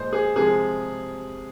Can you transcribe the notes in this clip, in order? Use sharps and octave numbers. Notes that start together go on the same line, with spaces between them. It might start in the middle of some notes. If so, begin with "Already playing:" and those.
Already playing: A#2 F3 G#3 C5 D#5
G#4
C3 F3 G#3 G#4